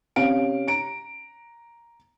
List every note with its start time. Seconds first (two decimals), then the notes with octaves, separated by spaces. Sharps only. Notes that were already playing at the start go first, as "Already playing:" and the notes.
0.16 C3 C#4 F5 D7
0.68 A#5 D7